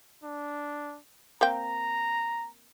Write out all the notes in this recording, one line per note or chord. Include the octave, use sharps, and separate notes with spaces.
D4
A#3 C4 G5 A#5